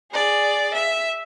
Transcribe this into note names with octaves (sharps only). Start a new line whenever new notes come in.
G#4 D5
E5